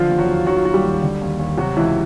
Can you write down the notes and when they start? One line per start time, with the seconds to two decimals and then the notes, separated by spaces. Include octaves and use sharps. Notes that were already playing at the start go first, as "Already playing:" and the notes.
Already playing: D3 F3 F4
0.10 D#2
0.19 F#3 F#4
0.28 D#2
0.47 D#3 F#3 F#4
0.56 F4
0.65 D#2 F#4
0.74 G3 G4
0.84 D#2
1.03 D3
1.21 D#2
1.39 D#2
1.57 C3 F#3 F#4
1.76 C#2 E3 E4